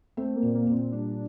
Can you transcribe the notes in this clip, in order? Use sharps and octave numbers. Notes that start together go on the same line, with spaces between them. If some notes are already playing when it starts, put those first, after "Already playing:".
A3 C4
A#3
A#2
A#3
A#2
C4
G3 D4